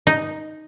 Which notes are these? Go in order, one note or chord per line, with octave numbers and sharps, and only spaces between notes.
D#4